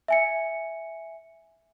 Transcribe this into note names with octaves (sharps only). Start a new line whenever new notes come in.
E5 G#5 C#7